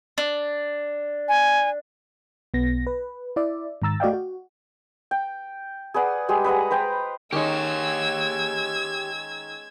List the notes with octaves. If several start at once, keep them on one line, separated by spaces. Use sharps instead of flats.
D4
G#5
B1 B3 A#6
B4
E4 D5 E5
G#2 D#3 A#5 E6 A6
A3 F#4 D5 D#5 F5 G5
F#4
G5
G#4 B4 D5 F#5
G3 G#3 G4 G#4
B4 D#5 F#5 A#5
B4 C5 G5 A#5
D#3 G#3 C#4 D#4 G4 C#5 E6 G#6